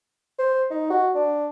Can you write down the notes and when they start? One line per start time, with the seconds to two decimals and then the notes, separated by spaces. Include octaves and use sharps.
0.39 C5
0.70 D#4
0.90 F#4
1.15 D4